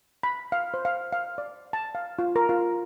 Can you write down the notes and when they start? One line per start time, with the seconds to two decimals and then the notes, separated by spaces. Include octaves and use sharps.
0.23 B5
0.52 F5
0.74 C5
0.85 F5
1.13 F5
1.38 D5
1.73 A5
1.95 F5
2.19 F4
2.36 A#4
2.49 F4